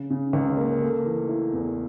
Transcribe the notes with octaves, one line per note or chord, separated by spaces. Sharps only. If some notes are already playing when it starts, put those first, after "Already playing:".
Already playing: C#3
C#3
C#2
A#3
A3
E3
E4
E2